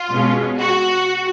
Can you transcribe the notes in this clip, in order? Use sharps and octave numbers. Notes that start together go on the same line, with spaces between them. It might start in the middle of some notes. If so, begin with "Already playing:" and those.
Already playing: F4
B2 G#3 C#4
F#4